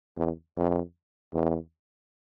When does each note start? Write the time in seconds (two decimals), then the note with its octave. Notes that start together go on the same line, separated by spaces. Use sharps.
0.18 E2
0.57 F2
1.34 E2